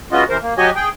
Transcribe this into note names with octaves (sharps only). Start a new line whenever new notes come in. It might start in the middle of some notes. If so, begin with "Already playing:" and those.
G#3 B3 C#4 F4 F#4 D#5
C3 E3 A#4 C5
A#3
F#3 F#4 G4 C#5 D#5 G#5
G#4 G5